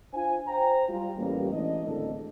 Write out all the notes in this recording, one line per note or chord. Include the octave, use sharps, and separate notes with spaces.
D4 F4 C5 F5 G#5
C5 G5 A#5
G3 F4
A1 G3 A#3
A1 E3 G#3 D4 D#5
G#1 D2 A2 D4 A4